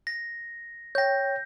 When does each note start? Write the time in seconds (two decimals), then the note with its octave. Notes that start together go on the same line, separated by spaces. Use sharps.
0.07 A#6
0.95 C#5 G5 G6 A#6